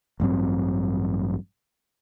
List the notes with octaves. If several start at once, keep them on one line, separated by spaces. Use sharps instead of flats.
A1 G2 F#3 C4